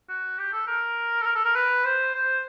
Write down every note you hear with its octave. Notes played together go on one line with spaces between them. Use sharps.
F#4
G4
A4
A#4
A4
A#4
A4
A#4
B4
C5
C5